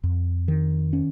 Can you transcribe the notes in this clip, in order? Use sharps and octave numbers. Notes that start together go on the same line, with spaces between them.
F2
D#3
C#4